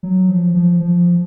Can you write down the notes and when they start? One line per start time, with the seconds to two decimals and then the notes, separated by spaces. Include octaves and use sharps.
0.03 F#3
0.29 F3
0.55 F3
0.80 F3